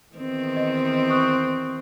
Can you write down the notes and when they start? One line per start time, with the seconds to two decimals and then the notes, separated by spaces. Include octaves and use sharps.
0.16 E2 D#3 C4
0.57 D#5
1.10 C#6 D#6 F#6